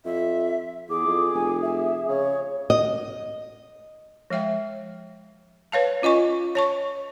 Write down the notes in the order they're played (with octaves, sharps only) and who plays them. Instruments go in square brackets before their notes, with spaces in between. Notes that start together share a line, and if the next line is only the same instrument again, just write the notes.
[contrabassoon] F2 [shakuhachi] E5
[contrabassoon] E2 [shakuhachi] G#4 [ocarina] D6
[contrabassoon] F2
[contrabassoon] F1 [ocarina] G#5
[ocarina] E5
[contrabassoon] C#3 [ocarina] C#5
[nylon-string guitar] D#5
[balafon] F3 G#3 E5 G5
B4 C#5 F5 A5
C#4 F4 D#5 G#5 C#6
C#5 A5 C#6